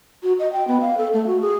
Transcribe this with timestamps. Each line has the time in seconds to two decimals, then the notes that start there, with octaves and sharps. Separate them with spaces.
0.23 F#4
0.39 D#5
0.53 G5
0.68 B3
0.81 F5
0.98 A4
1.13 A3
1.27 F#4
1.41 G#4